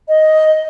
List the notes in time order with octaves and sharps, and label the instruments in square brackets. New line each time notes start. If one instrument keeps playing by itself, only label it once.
[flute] D#5